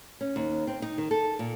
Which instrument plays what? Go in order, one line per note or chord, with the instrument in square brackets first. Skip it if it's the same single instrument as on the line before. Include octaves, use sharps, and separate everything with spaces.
[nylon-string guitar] C#4
D#2
C4
D#4
D#3
A4
A#2